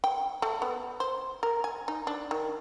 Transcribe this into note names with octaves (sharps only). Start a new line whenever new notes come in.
G5
A3
B3
C5
A#4
G#5
D#4
D4
D#3